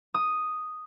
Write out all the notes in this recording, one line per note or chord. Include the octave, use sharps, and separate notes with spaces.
D#6